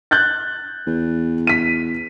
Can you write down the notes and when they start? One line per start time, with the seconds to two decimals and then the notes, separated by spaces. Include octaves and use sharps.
0.11 F#6 G6 A6
0.87 E2
1.47 B6 D#7